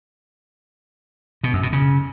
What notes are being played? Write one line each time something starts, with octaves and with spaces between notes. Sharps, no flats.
B2
F#2
B2
C#3